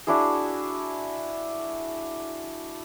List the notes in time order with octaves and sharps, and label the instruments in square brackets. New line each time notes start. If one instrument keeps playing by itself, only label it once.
[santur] D4 E4 F#4 G#4